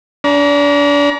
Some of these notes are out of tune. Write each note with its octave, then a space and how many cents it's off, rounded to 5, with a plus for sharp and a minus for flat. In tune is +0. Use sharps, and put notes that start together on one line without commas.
D4 -35 A#5 +30